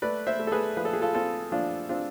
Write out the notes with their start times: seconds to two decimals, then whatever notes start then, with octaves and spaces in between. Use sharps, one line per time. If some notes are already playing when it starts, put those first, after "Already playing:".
0.02 A3 B4 D5
0.27 C5 E5
0.39 A3
0.47 A4
0.52 G#4 B4
0.77 F3 B4
0.85 A4
0.93 G#4
1.02 F4 A4
1.14 C4 F4 A4
1.52 F3 D4 F4
1.89 C4 D4 F4